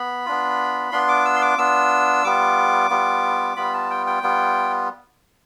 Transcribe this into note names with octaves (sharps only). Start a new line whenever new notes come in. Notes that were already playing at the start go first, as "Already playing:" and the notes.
Already playing: B3 B5
B3 D4 F4
B3 D4 F4 C6
D6
E6
C6
D6
B3 D4 F4 E6
G3 B3 F4 D6
G3 B3 F4
G3 B3 F4 B5
A5
G5
G5
G3 B3 F4